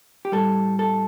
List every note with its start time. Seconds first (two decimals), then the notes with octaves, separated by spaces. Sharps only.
0.25 G4
0.32 A2 G3 A4
0.79 A4